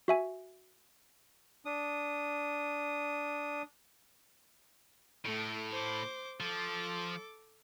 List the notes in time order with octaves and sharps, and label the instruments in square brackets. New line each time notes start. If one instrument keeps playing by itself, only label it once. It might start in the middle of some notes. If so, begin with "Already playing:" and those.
[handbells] F#4 E5 G#5
[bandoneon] D4 D#6
[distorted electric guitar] A2 [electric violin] A3 D7
[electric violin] C5 D6
[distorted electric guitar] F3 [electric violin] A4 D6